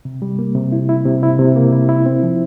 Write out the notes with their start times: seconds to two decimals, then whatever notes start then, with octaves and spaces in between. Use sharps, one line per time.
0.05 C3
0.22 G3
0.39 A#3
0.55 C3
0.72 E4
0.89 E4
1.06 C3
1.23 E4
1.39 C3
1.56 A#3
1.72 E4
1.89 E4
2.06 C4
2.23 F3